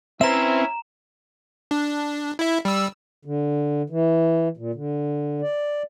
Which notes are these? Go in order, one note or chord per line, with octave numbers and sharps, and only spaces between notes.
C4 C#4 E4 B4 C5 E5 A#5 E7
D4
E4 E5
G3 E6
D3
E3
A#2
D3
D5